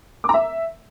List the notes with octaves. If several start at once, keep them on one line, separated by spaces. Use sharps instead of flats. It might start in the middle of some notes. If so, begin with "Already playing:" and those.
D6
A#5
E5